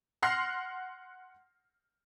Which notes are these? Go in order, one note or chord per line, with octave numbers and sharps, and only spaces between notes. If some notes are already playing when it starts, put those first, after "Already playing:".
F#5 C6 F6 A#6 C7